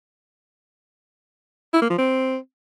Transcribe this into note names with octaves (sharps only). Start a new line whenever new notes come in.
E4
A#3
F3
C4